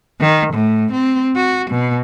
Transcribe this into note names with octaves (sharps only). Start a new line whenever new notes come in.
D#3
A2
C4
F#4
B2